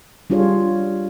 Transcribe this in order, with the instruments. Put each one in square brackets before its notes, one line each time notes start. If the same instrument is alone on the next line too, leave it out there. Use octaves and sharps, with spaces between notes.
[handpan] G3 D4 F4 G#4 C#5